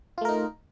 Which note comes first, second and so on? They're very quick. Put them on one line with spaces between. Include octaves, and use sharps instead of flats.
F4 A3 A#4 D#4